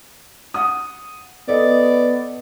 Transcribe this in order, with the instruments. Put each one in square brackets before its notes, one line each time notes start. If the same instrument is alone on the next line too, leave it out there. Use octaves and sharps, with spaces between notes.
[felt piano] F#5 D#6
[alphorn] B3 [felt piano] A4 D#5 [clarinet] D5